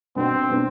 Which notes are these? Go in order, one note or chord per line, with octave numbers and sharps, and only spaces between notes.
B2 B3 C4 D4
B2 B3 D4